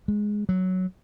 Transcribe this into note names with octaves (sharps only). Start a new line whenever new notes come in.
G#3
F#3